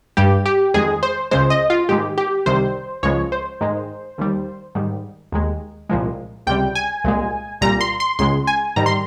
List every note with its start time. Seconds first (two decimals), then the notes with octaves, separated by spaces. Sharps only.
0.17 G2 G3 G4
0.46 G4
0.74 F2 D#3 G#3 G#4
1.03 C5
1.31 C#2 C#3 G#3 C5
1.50 D#5
1.70 F4
1.89 G#2 D#3 G#3 G4
2.18 G4
2.46 C2 C3 D#3 G3 C5
3.03 C#2 C#3 F3 G#3 C#5
3.32 C5
3.61 G#2 D#3 G#3
4.18 D#2 D#3 G3
4.75 G#2 D#3 G3
5.32 D#2 D#3 G#3
5.89 C2 A#2 F3 G#3
6.47 C#2 C3 G3 G5
6.75 G#5
7.04 C2 A#2 G#3
7.61 C2 A#2 G3 A#5
7.81 C6
8.00 C6
8.19 C#2 C#3 G#3 C6
8.47 G#5
8.76 G#2 D#3 G3 A#5
8.86 C6